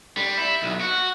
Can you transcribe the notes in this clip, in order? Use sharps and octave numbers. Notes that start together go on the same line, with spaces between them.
G3
E4
B1
F#4